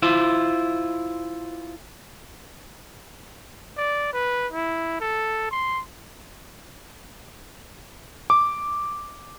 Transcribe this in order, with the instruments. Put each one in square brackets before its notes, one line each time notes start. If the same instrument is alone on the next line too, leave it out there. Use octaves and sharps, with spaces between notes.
[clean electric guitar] E4 F4 C5
[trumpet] D5
B4
E4
A4
C6
[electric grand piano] D6